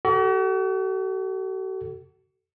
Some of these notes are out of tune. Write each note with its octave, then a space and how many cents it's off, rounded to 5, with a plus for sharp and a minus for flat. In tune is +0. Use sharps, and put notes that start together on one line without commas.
F#4 +45 A4 +0